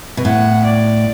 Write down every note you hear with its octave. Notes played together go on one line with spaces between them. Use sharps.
B2
A2 F#5
D5